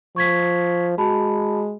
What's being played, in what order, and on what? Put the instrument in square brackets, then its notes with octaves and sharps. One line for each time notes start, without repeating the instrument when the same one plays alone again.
[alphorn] F3 [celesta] C#6 G#6 B6
[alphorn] G#3 [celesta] F#4 A5 B5